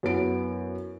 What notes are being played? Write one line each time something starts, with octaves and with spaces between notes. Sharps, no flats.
F#2 B3 E4 D7